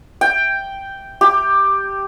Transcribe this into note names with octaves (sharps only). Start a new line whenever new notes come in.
G5
G4